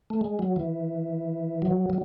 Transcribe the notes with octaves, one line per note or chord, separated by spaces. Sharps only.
A3
G#3
F#3
E3
F#3
F#3